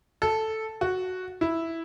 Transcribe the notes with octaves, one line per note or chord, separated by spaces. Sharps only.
A4
F#4
E4